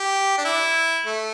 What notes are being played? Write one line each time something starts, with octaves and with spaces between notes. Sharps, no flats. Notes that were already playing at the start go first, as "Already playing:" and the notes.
Already playing: G4
D4
E4
A3